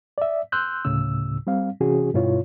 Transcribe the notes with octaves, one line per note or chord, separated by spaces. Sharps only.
D5 E5
C6 E6 F#6 G6
D2 A2 C#3 E6
G3 C4 F5
C3 E3 C#4 F#4 G#4
G2 B2 E4 F4 C#5